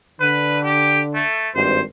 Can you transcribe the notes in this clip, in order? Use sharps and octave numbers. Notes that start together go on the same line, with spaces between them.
D3 B4
G4
A3
G#1 G2 C5